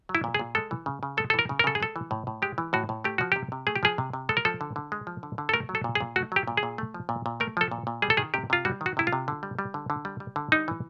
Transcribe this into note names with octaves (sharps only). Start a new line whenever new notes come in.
F#3
E4
A#2
G#4
A#2
G#3 A4
E3
C#3
C#3
G#3 A4
A4
E3
A#4
C#3
A#4
C#3 A4
G#4
G#3 A4
E3
A2
A2
G#3 G4
E3
A2 F#4
A2
A3 G4
F3 F#4
C3 G4
C3
A3 G#4
G4
F3 G#4
C3
C3
G#3 A4
A#4
F3 A4
D3
D3
G#3
F3
D3
D3
A4
A3 A#4
F#3
A4
A#2
G#4
A#2
A3 F#4
F#3 G4
A#2
G#4
A#2
A3
F3
A#2
A#2
A3 A#4
F3 A4
A#2
A#2
G3 G#4
A4
D#3 G#4
C3 G4
C3 F4
G3 F#4
D#3
F#4
C3 E4
F4
C3
D3
G3
G3
D3
D3
G3
G3
D3
G3 D#4
E3